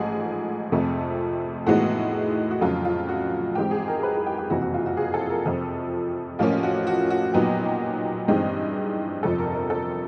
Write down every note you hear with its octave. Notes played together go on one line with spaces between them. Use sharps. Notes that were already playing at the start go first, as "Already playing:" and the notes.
Already playing: A1 G#2 F3 A3 G#4
F2 C3 F3 A3
A2 E3 G#3 B3 D#4 F#4
F#4
F2 C#3 F#3 A3 F4
F4
F#4
G#2 E3 G#3 C4 D#4 G4
G#4
A#4
B4
G#4
G4
G4
F#1 F2 C3 E3 F#4
F#4
F4
F#4
G#4
A4
A#4
F2 C3 F3 A4
A1 A2 F3 A#3 C#4 F4
F#4
F#4
F#4
A#2 F#3 B3 D#4 G4
G2 E3 G#3 C4 D#4
G1 F2 C3 F3 A4
A#4
A#4
A4